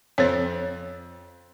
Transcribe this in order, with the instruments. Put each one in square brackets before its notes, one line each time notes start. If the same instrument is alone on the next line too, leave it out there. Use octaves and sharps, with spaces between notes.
[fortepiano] F2 [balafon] C5 C#5